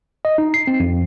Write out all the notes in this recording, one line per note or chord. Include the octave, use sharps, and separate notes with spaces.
D#5
D#4
C7
C4
F2